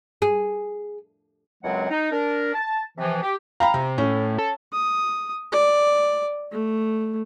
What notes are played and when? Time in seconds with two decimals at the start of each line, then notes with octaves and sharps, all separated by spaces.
0.22 G#4
1.64 C#2 F#2 F#3 G#3 C4 F#5
1.90 D#4
2.11 D4 A#4
2.54 A5
2.98 C3 E3 F3
3.23 G4
3.60 F5 G5 A#5 B5
3.74 C3 A#5
3.98 A2 C#4
4.38 A4
4.73 D#6
5.52 D5
6.52 A3